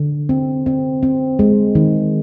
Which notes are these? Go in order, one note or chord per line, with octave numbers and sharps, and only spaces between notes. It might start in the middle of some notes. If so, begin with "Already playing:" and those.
Already playing: D3
C4
C4
C4
G#3
D#3